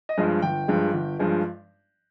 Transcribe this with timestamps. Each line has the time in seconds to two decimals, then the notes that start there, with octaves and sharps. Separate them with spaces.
0.09 D#5
0.18 G2 F3 G#3
0.42 G1 G5
0.68 G2 F3 G#3
0.94 G1
1.19 G2 F3 G#3